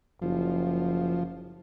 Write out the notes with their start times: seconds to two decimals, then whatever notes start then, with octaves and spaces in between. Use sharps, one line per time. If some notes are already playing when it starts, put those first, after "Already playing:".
0.22 F#1 F3